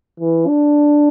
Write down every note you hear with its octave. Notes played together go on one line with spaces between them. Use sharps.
E3
D4